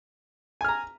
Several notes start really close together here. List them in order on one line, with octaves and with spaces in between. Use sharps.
G#5 F6 A#5